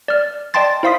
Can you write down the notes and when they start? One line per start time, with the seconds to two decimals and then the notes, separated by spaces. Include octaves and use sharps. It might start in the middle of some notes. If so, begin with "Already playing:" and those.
0.08 D5 F6
0.54 D5 D#5 G5 A5 C6 A6
0.83 E4 C5 F5 C6 D#6 B6